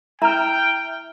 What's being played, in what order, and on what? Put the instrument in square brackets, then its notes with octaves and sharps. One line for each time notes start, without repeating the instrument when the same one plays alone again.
[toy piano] E4 A#5 [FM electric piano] E5 F6 [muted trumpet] G5